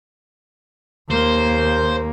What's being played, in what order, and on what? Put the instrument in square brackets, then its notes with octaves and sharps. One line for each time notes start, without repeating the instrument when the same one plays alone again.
[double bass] D#2 A#3 [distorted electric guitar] C5